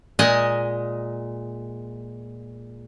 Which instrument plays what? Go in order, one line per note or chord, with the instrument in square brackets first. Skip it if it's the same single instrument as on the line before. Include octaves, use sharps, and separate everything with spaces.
[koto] A#2 G#3 D#5 G#5